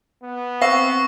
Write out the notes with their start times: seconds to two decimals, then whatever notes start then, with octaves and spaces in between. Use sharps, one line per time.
0.23 B3
0.62 C4 F5 C#6 E6 A#6